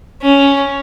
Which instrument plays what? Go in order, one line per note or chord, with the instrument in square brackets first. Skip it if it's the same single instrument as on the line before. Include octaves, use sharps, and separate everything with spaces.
[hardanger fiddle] C#4